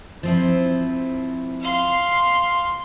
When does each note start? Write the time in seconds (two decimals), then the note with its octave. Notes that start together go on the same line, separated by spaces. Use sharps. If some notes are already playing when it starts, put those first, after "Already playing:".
0.23 F3 C4 E4
1.61 F5 C6